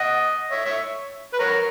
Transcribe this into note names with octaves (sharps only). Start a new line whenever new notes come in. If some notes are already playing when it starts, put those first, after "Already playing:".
Already playing: D#5 F#5
C#5 E5
C#5 E5
B4
A#4 C#5